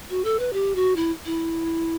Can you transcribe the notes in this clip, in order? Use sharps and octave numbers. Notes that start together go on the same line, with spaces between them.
F#4
A4
B4
G4
F#4
E4
E4